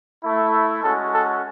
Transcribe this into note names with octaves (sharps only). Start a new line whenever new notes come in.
A3 E4
G#3 C#4 F#4 A4
A4